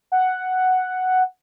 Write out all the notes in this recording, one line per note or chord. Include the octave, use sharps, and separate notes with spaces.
F#5